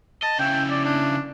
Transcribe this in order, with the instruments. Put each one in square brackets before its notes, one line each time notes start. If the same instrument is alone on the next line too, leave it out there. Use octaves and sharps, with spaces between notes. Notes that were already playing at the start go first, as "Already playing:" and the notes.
[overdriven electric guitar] D#5 [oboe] A5
[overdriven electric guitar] C#3 E4 [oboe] G5
[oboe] D5
D4